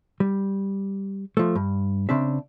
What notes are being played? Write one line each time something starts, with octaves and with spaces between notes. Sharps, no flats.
G3
F3 A3
G2
C#3 C4 D4 E5